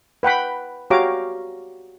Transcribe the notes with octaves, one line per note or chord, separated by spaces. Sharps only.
B4 F#5 G5 B5
F#4 G4 C#5 F5 A#5 D6